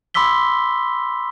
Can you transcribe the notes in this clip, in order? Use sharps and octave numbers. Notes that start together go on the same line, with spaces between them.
B5 C6 D6 E6 B6 G7